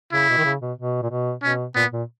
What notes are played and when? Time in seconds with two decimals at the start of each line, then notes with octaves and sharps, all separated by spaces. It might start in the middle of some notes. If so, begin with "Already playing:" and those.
0.12 C#3 E4
0.29 B2
0.38 D#3
0.45 C#3
0.61 B2
0.78 B2
1.02 A#2
1.10 B2
1.43 B2 C#4
1.75 A#2 B3
1.93 A#2